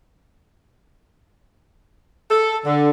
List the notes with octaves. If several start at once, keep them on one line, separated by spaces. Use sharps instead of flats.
A4
D3